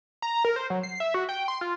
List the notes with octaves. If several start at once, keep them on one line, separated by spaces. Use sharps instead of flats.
A#5
A#4
C5
F#3
C7
E5
F#4
G5
C6
F4